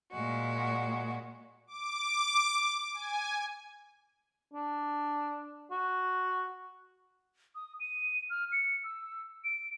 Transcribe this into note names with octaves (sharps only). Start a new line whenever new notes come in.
A#2 G#3 F#4
D6
G#5
D4
F#4
D#6
D#7
F6
C#7
E6
D7